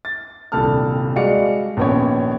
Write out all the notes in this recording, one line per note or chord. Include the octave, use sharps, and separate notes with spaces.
A6
D#1 C2 G2 A4 A5 F6
G3 G#3 F#4 D5 F5 C#7
A#1 D#2 B3 C#4 C#5